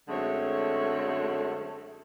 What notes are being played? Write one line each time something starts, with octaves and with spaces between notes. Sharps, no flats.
F#2 D3 G#3 A3 C4 C#5